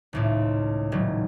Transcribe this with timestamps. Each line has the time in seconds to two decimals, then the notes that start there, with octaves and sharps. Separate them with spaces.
0.13 G#1 C#2 A2
0.92 D#1 F#3